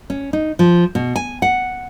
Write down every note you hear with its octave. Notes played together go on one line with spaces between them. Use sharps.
C#4
D#4
F3
B2
G#5
F#5